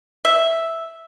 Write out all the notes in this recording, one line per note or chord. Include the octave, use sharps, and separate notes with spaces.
E5